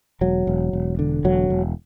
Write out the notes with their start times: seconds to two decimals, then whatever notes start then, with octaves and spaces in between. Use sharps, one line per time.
0.21 E1 F#3
0.47 E1
0.73 E1
0.99 D3
1.24 E1 F#3
1.50 E1